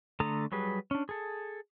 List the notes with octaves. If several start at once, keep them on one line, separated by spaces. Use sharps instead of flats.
D3 A3 A4 A#5 D#6
F#3 G3 G#4 B4
C#4 D4
G#4 A4